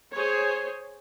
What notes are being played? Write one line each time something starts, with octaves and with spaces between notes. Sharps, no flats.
G#4 C5 C#5